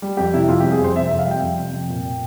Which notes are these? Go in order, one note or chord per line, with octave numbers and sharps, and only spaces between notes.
G3
F2 G4
C3 E4
F2 F4
G3 G4
G#4
F2 C5
C3 E5
F2 E5
F5
G3 G5
F2
C3
F2
A#2
A#2